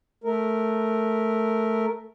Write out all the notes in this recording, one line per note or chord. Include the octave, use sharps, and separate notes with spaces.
A3 A#4